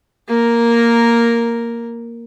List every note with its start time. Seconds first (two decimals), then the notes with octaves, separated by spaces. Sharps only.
0.28 A#3 A#4